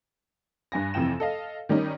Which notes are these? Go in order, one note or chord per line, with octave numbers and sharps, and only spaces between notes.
G2 G#5 A#6
F2 C3 E3 G5 E7
A4 D#5 F5
D#3 G3 C#4 D#4